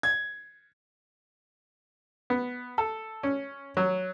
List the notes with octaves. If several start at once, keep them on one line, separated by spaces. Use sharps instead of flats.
G#6
B3
A4
C#4
F#3